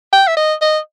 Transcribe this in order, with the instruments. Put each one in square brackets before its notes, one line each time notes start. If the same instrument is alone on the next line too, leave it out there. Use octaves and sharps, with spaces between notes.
[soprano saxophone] G5
E5
D#5
D#5